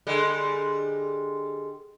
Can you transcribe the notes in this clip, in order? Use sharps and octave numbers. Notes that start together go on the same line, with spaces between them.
D3 G3 G#3